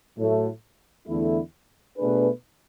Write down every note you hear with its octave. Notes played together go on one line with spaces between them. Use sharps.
A2 F#3 A3
E2 D3 A3 E4
B2 A3 D4 G#4 B4